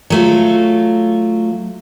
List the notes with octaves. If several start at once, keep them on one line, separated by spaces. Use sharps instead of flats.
F#3 A3 F4